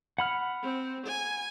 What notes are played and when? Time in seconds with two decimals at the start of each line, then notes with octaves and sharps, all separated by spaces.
0.18 F#5 B5 F6
0.63 C4
1.07 G#5